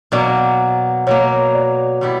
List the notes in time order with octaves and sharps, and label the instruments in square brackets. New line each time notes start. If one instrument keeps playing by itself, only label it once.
[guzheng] B2 F#3 A#3 [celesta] D5
[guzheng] B2 F#3 A#3 [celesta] C#5
[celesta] D5
[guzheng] B2 G3 B3 E4